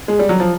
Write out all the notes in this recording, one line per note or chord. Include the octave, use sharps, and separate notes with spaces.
G#3
G3
F#3
F3